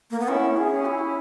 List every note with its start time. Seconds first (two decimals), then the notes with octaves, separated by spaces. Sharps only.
0.11 A#3
0.20 B3
0.28 C#4 E4
0.57 G#4
0.71 C#4
0.85 E4